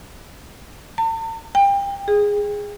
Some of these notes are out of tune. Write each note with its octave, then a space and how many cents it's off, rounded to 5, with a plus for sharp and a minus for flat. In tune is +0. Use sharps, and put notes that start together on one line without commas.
A5 +45
G5 +25
G#4 -10